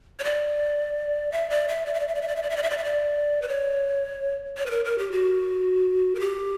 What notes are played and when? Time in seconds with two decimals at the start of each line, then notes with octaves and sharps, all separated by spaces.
0.19 C#5
0.24 D5
1.32 E5
1.50 D5
1.68 E5
1.86 D5
1.94 E5
2.00 D5
2.08 E5
2.15 D5
2.21 E5
2.28 D5
2.36 E5
2.43 D5
2.50 E5
2.57 D5
2.63 E5
2.70 D5
2.78 E5
2.84 D5
3.42 B4
3.48 C#5
4.58 C#5
4.66 B4
4.71 A#4
4.85 A#4
4.98 G4
5.12 F#4
6.15 A#4
6.20 G4